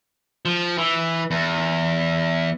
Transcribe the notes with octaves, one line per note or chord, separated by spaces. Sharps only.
F3
E3
E2